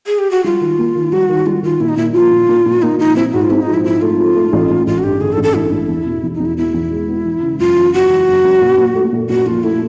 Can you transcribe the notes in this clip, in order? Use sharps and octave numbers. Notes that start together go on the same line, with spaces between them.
G#4
G4
F#4
G3 F4
D#3
A#3
D#3
G3 F#4
D#3
G3 F4
D#3 F4
A#2 E4
D#4
A#2 E4
F3 F4
A#2
A#2
A#2
A#3 D#4
F3 D#4
C4 E4
G#2 F#4
F4
C4 E4
D#4
F3
E4
F3 E4
A3 F4
F3
A3
A1
A1
A1 F4
F#4
G2 G4
D3 G#4
A4
A1
A4
A1 E4
A1
E2
B2
E2
D#4
E2
E4
B3 E4
E2
G#3
B3
E3
C#3
F#1 F4
E3
F#1 F#4
E3
F#1
F#2
A#2
A#2
A3
A#2
A#2 F#4
F3 F4
A3 E4